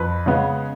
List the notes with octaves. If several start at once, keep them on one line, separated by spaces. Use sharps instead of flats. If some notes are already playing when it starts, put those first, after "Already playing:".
Already playing: F2 B4
C#3 G#3 B3